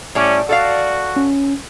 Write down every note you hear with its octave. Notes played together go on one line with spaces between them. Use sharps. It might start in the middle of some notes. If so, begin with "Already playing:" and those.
A2 G3 C#4 D5
F#4 A4 D5 F5
C#4